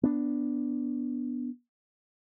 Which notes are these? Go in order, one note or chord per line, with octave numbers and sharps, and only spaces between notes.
B3 D4